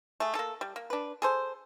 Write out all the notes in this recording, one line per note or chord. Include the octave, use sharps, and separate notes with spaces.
A3 G#4
A#3 A4
G3
A#3
D4 B4
G#4 A4 C5